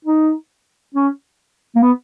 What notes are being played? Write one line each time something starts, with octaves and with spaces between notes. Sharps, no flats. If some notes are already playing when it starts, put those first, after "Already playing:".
D#4
C#4
A#3
B3